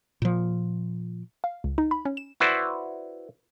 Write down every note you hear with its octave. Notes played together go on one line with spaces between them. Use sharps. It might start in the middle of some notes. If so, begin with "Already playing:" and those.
A#2 F3
F5
C#2
D#4
B5
C#4
E7
E4 F#4 B4 C5 D5